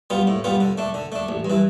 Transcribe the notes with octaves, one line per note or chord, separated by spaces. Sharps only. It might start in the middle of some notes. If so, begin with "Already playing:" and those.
G3 B3 F4
A2
G3 B3 F4
D3
A3 D4
D3
A3 D4
A1
G2
E3